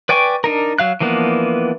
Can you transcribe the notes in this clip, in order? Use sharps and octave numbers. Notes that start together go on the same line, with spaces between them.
B4 D5 G5 G#5 C#6
D4 D#4 A#4
F#3 F5 F#6
E3 F3 A#3 B3 D4